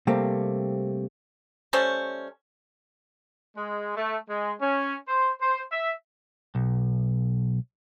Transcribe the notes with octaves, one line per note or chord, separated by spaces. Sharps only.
C3 G3 A3 A#3 C4
G3 A3 C#4 C5
G#3
A3
G#3
C#4
C5
C5
E5
B1